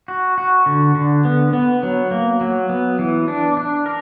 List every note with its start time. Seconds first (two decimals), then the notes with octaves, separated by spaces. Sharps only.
0.08 F#4
0.38 F#4
0.66 D3
0.95 D3
1.25 B3
1.53 B3
1.83 F#3
2.11 A#3
2.41 F#3
2.69 B3
2.99 E3
3.28 D4
3.57 D4
3.86 A#4